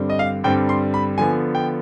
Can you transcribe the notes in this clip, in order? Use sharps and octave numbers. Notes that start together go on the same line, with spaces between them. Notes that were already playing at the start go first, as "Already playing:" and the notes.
Already playing: G2 D3 G3 C4
D#5
F5
G2 D3 G3 C4 G5
C6
B5
D3 F3 B3 G#5
G5